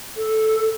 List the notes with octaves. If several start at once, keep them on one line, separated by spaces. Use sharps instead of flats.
A4